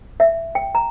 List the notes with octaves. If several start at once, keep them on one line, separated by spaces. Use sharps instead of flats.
E5
G5
A#5